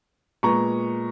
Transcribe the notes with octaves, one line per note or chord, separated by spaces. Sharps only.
A#2 G#3 B3 A#5 C#6